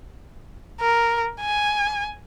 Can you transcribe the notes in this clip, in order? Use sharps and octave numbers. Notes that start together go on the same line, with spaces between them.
A#4
G#5